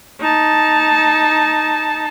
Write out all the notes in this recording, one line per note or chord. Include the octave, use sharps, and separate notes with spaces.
D#4 A5